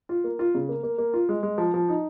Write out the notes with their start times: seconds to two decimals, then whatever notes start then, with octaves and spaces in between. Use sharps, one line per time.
0.09 F4
0.24 A#3
0.39 F4
0.55 C#3
0.69 A#3
0.83 A#3
0.98 A#3
1.14 F4
1.29 G#3
1.43 G#3
1.58 F3
1.74 F3
1.89 D#4